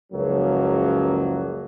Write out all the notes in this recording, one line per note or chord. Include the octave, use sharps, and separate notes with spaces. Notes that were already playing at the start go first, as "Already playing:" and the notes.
F#1 C#2 F#2 F3 F#3 A#3